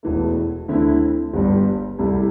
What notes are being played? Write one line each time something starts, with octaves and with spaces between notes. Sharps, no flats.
E1 E2 E3 A3
D2 D3 A3 C4 E4
G1 G2 G3
C2 C3 G3 E4 A4